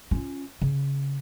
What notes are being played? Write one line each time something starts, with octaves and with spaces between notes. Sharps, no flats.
C#4 F4
C#3